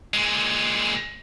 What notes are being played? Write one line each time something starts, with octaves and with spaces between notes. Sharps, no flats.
A#2 G#3